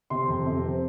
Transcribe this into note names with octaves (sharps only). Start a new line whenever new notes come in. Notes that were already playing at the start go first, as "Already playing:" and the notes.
C3 C6
F2
C3
C4